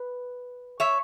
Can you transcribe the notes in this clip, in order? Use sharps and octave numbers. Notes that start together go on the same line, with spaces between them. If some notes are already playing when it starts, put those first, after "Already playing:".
Already playing: B4
C#5 E5